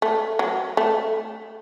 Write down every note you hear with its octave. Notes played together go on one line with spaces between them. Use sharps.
A3
F#3
A3